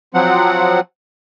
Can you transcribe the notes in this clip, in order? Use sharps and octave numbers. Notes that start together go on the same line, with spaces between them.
F3 F#3 C4 F#5